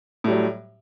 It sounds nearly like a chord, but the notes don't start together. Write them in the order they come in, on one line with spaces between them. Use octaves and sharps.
A2 G3 F#3